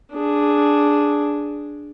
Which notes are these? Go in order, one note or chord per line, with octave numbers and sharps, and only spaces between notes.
D4 G#4